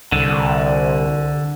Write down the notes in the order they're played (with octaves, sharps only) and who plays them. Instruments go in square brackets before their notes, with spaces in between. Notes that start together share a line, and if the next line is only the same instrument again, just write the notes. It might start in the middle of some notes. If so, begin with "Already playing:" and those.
[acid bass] C2 [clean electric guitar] D3